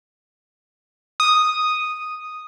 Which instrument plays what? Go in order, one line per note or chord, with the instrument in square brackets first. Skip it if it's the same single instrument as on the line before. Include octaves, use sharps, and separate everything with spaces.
[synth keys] D#6